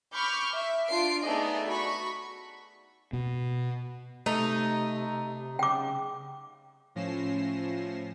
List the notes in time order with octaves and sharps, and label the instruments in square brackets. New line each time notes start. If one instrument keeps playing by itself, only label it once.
[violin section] B5 C#6 D6 F6 G6
E5
D4 F4 C7 D7
A3 B3 D#4 G#4 D5 D#5
F#4 B5 C#6
[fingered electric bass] B2
[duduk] C3 [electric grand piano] A3 [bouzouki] D#4
[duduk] C#3 [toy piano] G5 D6
[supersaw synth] A2 F3 C#4 A#6 C7 E7